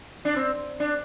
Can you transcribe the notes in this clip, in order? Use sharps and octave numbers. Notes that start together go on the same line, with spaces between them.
D4
C4
D4